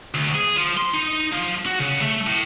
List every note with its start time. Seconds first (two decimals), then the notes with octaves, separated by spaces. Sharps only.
0.14 D2
0.34 G#4
0.56 F3
0.77 C6
0.94 D#4
1.32 F3
1.66 F#4
1.79 C#3
2.01 A3
2.27 A2